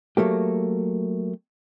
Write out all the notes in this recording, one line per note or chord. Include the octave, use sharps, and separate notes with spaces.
F#3 A3 A#3 G4